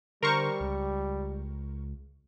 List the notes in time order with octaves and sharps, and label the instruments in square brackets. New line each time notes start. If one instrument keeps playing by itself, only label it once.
[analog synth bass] D3 [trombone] G3 [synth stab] A#4 C5 C#6
[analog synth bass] C#2